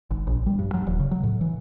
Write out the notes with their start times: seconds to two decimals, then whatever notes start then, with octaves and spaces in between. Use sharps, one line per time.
0.11 G#1
0.27 A#1
0.46 G3
0.59 G2
0.74 F#3
0.87 D#1
1.00 C#3
1.11 F#3
1.23 A2
1.41 E3